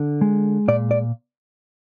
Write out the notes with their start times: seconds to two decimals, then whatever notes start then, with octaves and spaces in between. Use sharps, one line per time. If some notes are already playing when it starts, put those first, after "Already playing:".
Already playing: D3
0.21 G#3
0.68 A#2 D5
0.91 D5